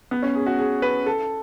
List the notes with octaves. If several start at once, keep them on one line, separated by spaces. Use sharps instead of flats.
B3
C#4
G#4
F#4
G#4
B4
A4